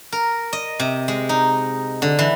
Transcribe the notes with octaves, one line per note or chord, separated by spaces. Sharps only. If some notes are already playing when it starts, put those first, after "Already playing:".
A#4
D#5
C3
G#3
D#4
D3
E3